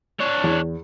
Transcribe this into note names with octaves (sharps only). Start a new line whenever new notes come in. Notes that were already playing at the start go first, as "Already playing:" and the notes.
D4 C#5
E2